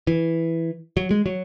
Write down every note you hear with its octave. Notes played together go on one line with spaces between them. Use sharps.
E3
F#3
G#3
F#3